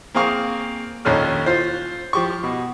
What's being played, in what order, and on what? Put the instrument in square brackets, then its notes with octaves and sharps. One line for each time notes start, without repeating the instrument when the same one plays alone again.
[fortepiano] A#3 C4 G#4 F5 C#6
A#1 D#2 D#3 C#4 A4 F6
F4 C5
F3 G4 C#6
B2